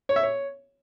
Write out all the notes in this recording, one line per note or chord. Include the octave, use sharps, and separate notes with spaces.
C#5
E5
C#5